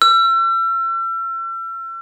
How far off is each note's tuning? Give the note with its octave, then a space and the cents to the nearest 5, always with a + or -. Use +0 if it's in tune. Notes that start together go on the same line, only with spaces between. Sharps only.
E6 +40